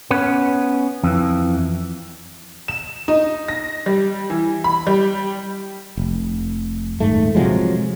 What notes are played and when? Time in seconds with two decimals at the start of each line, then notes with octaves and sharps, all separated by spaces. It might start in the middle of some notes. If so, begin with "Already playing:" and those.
0.11 B3 C#4 B4
1.04 F2 E3
2.68 E7
3.08 D#4
3.48 A#6
3.86 G3
4.30 E3
4.64 B5
4.87 G3
5.97 F1
7.00 D#1 G#2 A3
7.35 C3 F3 F#3 G#3